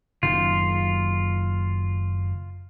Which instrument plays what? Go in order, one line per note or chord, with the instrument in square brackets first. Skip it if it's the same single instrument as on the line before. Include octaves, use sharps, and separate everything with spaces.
[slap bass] F#1 F#2 D#3 [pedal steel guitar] F4